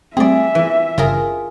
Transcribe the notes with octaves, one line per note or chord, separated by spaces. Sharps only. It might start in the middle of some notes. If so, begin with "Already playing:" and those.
G3 A3 C4 G#4 D5 E5
E3
G1 C#3 F4 G#4 A#4